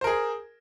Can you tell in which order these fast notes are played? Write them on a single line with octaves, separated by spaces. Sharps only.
C5 A#4 G#4